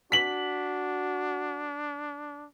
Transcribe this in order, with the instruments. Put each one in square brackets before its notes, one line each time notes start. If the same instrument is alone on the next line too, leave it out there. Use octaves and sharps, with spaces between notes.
[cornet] D4 [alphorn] F#4 [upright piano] B6 F#7